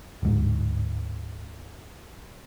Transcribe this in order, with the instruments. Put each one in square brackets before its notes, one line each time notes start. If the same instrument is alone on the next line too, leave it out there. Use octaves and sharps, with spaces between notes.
[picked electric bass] D1 G#2